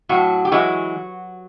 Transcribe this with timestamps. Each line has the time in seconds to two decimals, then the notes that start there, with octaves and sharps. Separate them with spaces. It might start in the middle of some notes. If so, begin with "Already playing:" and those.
0.09 A2 F#3 F#4
0.45 G4
0.52 E3 F#3 G#3 F#4